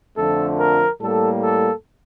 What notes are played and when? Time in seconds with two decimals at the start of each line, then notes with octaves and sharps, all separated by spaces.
0.16 F2 D3 F3 A3 A4
0.59 A#4
1.01 A2 G3 A#3 A4
1.43 A4